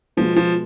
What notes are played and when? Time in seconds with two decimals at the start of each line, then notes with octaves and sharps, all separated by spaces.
0.17 B2 F3 G#3 B3
0.36 F3